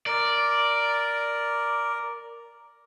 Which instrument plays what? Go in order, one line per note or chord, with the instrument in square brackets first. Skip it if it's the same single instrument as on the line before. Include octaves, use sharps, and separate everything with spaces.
[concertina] A#4 [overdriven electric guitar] D5